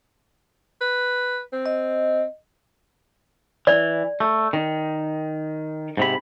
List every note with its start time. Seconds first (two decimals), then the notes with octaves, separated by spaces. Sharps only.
0.81 B4
1.53 C4
1.66 D#5
3.67 E3 D5
4.20 A3
4.53 D#3
5.97 G#2 C3 B5